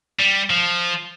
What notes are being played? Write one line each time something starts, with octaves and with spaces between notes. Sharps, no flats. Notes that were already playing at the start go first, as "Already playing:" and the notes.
G3
F3